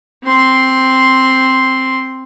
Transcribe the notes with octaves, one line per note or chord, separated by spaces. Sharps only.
C4 C6